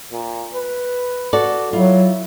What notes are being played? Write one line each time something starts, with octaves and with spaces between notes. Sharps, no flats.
A#2
B4
F#4 A4 D5
F#3 E4 F4